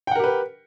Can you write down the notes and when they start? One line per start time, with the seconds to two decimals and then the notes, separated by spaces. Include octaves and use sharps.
0.07 G5
0.11 F#5
0.16 A#4
0.20 G4
0.24 B4